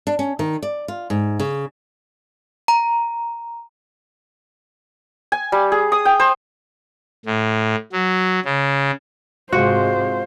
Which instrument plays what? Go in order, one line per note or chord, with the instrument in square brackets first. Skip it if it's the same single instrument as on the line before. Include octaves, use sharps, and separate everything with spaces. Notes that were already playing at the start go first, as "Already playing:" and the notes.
[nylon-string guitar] D4
C#4
D#3
D5
F4
G#2
C#3
[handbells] A#5
[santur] G#5
G3
G#4
D#6
G5
C5
[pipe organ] A2
F#3
C#3
[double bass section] G#2 C3 G#3 [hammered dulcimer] F4 [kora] F#4 [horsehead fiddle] C5